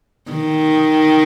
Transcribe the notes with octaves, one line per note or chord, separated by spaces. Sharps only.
D#3